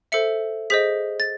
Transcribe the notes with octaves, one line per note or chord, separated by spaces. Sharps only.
A4 C5 E5 C#7
G#4 C5 D#5 B6
A6